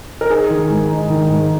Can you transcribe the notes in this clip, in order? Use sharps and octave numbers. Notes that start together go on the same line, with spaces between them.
A#4
D#4 G#4
D#3
G#2
D#4
D#3
G#2